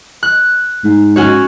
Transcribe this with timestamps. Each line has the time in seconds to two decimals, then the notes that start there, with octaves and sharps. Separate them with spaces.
0.23 F#6
0.85 G#2
1.16 C#4 F#4 C#5